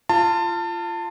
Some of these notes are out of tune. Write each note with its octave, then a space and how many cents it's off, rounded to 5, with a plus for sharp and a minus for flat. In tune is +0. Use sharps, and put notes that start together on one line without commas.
F4 -20 A5 +25